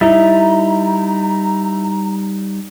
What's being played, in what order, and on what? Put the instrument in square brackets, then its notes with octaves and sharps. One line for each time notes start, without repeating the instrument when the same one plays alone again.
[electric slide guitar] G3 D#4 [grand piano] E4 [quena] A#5